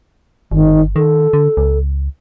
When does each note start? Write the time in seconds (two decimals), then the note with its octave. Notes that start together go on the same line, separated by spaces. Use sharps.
0.51 G1 D#3
0.96 D#3 A4
1.33 D3
1.57 C#2